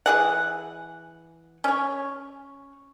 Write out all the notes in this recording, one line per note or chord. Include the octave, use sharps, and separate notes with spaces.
E3 G#4 F#5
C#4 C#5